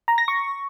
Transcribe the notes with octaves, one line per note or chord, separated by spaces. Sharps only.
A#5
A#6
C#6